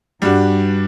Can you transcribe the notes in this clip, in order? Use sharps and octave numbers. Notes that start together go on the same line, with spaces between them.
G2 G3 D4 F#4